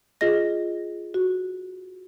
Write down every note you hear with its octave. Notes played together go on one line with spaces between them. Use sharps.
F4 G#4 D#5 A#6
F#4